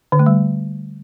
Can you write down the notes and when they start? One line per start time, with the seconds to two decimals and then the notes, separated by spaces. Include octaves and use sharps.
0.12 D3
0.19 A3
0.26 G3